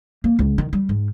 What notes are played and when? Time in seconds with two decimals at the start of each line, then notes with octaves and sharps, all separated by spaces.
0.24 A#3
0.39 C#2
0.58 D#3
0.73 G3
0.89 G#2